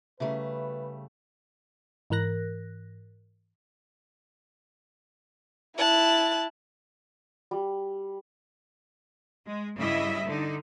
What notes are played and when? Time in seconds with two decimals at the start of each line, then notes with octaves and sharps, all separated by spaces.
0.20 C#3 G3 A3 E4 G#4 B4 E5
2.10 G#2 E3 A#4 F#6 A#6
5.78 E4 A5 F#6
7.51 G3
9.46 G#3
9.77 G2 C#3 G3 E4 D#5 E5
10.26 D3 D#4